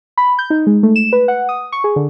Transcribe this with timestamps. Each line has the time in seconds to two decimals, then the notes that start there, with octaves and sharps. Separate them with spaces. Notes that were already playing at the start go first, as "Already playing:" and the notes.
0.18 B5
0.39 G6
0.50 D#4
0.67 G#3
0.83 A3
0.96 E7
1.13 B4
1.28 F#5
1.49 D#6
1.72 C#6
1.84 G#4
1.96 D3